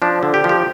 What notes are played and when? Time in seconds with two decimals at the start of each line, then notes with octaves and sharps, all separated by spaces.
0.02 F3 D4
0.23 D3
0.34 G4
0.44 F3
0.49 G4